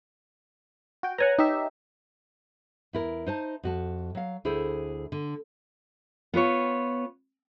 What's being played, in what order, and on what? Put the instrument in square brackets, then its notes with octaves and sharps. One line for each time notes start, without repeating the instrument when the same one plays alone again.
[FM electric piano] F#4 G5
[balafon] B4 C#5 [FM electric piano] F#5 G#5 A#5
[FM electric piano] D#4 G4 E5
[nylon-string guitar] E2 E4 A#4
D#4 C5 A5
F2 F#4 A5
F#3 F5
D2 E4 G#4 A4 C5
D3
[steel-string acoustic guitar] B3 F4 B4 C#5